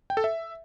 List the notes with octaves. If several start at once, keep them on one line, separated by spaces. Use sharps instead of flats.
G5
A4
E5